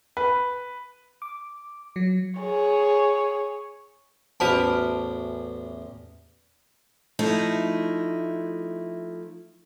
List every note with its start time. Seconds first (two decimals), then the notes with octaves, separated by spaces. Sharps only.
0.17 B4
1.22 D6
1.96 F#3
2.40 G#4 C#5
4.40 A1 E2 F#4 C5 F#5 A5
7.19 F3 A3 D#4 E4